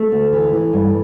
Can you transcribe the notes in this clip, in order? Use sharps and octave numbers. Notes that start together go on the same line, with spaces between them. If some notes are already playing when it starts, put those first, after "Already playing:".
Already playing: A3
D2
E3
E3
G2